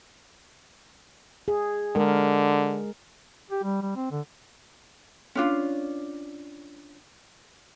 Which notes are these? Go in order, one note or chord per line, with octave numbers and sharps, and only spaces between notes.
G#4
D3 G#3 A#4
G4
G3
G3
C4
D3
C#4 D4 F4